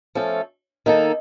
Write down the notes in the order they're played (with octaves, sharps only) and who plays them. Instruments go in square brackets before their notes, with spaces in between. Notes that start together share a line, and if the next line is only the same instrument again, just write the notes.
[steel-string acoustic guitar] F3 A3 C#4 A4
[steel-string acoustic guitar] D#3 A#3 D#4 A4 [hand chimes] D#5